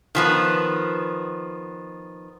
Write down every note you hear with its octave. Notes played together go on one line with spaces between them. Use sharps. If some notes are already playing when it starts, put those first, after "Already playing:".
D#3 F3 B3